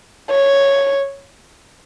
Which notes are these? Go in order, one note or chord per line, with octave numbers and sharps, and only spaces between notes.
C#5